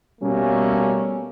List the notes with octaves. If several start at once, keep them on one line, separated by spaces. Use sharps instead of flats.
B2 G3 A3 A#3 C#4